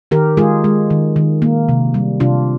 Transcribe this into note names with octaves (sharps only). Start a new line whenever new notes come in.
D#3 G4 A#4
G#3 F4 G#4
G#3
D#3
D#3
A#3
C3
G3
C3 D4 F4